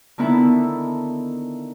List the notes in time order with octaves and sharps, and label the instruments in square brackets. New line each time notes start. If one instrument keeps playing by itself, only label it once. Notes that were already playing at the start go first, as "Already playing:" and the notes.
[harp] D3 D#3 B3 E4 E5 A5